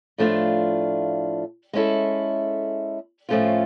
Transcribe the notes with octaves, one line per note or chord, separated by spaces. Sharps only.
A2 F3 A3 D4 F4
G#3 C#4 E4 A4
A2 F3 A3 C#4 F4